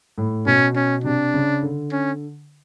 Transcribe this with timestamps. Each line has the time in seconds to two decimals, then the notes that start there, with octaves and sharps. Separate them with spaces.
0.18 A2
0.46 B2 C#4
0.76 C#4
1.04 C3 D4
1.34 C#3
1.63 D3
1.91 C#4